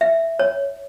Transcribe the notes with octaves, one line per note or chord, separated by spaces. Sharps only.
E5
C#5